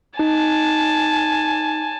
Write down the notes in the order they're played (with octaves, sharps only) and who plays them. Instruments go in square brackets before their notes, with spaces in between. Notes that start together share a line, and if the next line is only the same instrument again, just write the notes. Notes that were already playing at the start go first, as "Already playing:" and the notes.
[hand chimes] D#4 [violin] G#5 A5